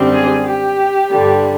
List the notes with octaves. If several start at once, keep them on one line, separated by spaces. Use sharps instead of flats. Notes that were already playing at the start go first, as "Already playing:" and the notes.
Already playing: F#2 D3 G3 C4
G#4
G4
G2 D3 G3